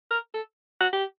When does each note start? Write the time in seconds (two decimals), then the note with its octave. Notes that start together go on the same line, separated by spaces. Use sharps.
0.11 A#4
0.34 A4
0.80 F#4
0.93 G4